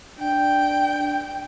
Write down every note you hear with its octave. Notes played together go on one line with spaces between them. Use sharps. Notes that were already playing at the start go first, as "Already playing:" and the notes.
D4 G5